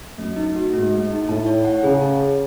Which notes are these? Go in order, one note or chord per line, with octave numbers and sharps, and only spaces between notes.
F#2 A3
D#4
F#4
G#2 A3
A3
D#4
A2 A5
C#5
F#5
C#3 G#4
A5
C#5